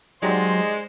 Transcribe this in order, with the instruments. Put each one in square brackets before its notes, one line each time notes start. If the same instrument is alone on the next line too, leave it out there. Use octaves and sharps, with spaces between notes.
[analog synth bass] F#3 [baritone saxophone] G#3 [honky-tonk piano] D#4 G4 D5 [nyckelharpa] C5